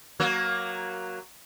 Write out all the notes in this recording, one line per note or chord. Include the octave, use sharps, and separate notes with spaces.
F#3 A#3